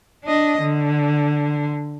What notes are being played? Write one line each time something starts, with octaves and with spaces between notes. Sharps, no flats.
D4 D#5
D3